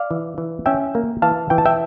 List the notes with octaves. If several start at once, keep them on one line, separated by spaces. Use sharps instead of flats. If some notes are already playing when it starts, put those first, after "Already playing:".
Already playing: D5 F5
E3
E3
C#4 E5 G5
A#3
E3 F5 A5
E3 G5
A5
E5 G5